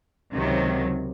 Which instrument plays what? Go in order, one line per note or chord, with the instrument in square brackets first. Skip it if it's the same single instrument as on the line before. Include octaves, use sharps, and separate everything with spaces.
[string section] C#2 C3 D#3 F#3